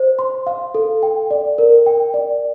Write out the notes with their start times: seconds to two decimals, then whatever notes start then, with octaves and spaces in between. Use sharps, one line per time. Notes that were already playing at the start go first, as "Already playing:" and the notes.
Already playing: C5
0.19 C6
0.47 F5
0.74 A4
1.03 G5
1.31 D5
1.58 A#4
1.86 G5
2.14 D5